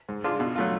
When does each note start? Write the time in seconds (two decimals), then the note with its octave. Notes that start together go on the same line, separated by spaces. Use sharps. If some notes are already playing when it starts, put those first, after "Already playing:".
0.09 G#2
0.24 G#3 D4 F4
0.40 B2
0.56 F#3 A3 F4